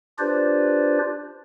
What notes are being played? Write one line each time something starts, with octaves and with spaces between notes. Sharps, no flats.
D4 F4 G4 B4 C5 D5